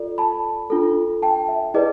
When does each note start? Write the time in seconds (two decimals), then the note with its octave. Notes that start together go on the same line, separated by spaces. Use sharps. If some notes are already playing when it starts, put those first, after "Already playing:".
Already playing: F4 A4 D5
0.18 A5 B5
0.70 D4 F4 A4
1.22 G5 A5
1.48 E5
1.74 E4 G#4 B4 D5 D#5